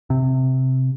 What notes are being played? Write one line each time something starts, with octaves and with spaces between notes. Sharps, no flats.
C3